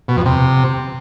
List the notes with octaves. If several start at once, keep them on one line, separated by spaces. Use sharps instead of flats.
B2
F2
C3